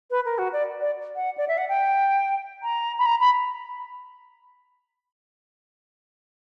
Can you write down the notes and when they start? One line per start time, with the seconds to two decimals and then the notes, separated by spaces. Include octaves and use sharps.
0.10 B4
0.25 A#4
0.38 F#4
0.53 D5
0.81 D5
1.15 F#5
1.37 D5
1.48 E5
1.58 F#5
1.69 G5
2.63 A#5
2.99 B5
3.06 A#5
3.20 B5